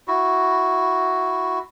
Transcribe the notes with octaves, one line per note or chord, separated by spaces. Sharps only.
E4 F#4